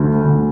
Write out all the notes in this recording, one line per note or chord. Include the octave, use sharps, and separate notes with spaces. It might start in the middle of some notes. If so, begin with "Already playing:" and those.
Already playing: D2 D3 A3
D2 D3 A3